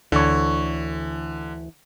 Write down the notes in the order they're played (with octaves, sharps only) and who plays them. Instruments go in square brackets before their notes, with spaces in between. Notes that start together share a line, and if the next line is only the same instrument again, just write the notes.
[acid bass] D2 [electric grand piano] D3 [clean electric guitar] E3 C#5